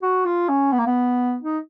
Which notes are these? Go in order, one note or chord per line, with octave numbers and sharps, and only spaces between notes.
F#4
F4
C#4
B3
A#3
B3
D#4